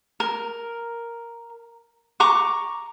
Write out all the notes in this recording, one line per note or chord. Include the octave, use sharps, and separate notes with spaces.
A#4
A#5 C#6 D6